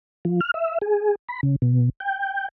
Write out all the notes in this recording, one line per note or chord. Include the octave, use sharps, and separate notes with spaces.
F3
F6
E5
G#4
B5
C#3
B2
G5